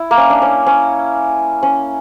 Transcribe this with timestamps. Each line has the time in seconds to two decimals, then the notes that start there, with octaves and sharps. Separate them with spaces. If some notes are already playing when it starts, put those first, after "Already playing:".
Already playing: E4
0.11 A#3
0.17 C#4
0.30 D4
0.42 C#4
0.66 C#4
1.63 C#4